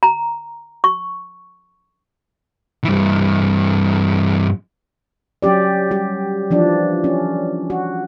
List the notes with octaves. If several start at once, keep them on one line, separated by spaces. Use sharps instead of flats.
A#5
C#6
G2 E3
F#3 C#4 G4 D5
G3 G4
E3 F3 D4
C#4
F#4